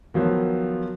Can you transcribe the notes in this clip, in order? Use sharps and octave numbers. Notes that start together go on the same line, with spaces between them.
D#3 F3 F#3 B3